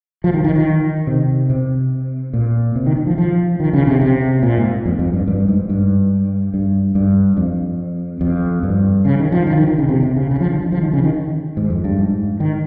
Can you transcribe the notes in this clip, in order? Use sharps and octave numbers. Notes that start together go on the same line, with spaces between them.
F3
D#3
D#3
D#3
C3
C3
A#2
C3
D#3
D#3
F3
F3
D#3
C#3
C3
C3
A#2
G#2
F2
F2
G2
G2
G#2
G2
G2
G2
F2
F2
G2
C#3
D#3
F3
D#3
D#3
D#3
C#3
C3
C3
C#3
C#3
F3
D#3
F3
F3
D#3
C#3
D#3
D#3
G#2
F2
G2
G#2
D#3